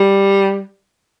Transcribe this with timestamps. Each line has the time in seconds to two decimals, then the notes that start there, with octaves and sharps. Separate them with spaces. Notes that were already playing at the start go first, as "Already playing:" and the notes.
Already playing: G3